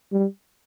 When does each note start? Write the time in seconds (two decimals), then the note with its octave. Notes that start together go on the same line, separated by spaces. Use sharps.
0.12 G3